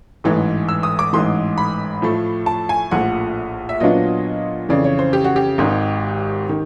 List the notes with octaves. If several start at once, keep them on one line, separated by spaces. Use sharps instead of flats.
A1 G#2 E3 A3
E6
D#6
D6
A1 G#2 E3 C6
B5
A2 F3 A3
A5
G#5
A#1 A2 F3 F#5
E5
A#2 F#3 B3 D4 F4 D#5
F2 C#3 E3 D5
C#5
C5
G4
F#4
G4
G#1 G#2 D#3
D#3